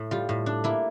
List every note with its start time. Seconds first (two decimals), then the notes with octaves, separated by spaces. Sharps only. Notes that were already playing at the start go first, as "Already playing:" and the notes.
Already playing: A2
0.11 G3 F4
0.29 A2
0.46 D4
0.64 A#3 E4